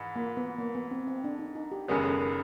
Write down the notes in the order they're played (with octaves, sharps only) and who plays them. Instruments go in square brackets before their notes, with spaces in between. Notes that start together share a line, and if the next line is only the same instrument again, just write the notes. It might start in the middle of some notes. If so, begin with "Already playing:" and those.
Already playing: [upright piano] G#2 E3
[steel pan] A#3
B3
A#3
B3
C4
C4
D4
D#4
D#4
G4
[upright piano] F#1 F#2 D#3 G#3 B3 [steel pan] G4
[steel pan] A4
A#4